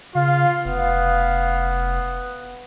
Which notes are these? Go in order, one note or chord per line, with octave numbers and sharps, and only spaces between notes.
C#3 F4 F5
F1 B3